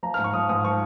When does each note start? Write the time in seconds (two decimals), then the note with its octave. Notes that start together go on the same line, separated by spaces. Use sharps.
0.03 F3 A#5
0.14 G#2 F6
0.24 C#6
0.33 F3 D#6
0.49 G#2 D#6
0.64 F3 C#6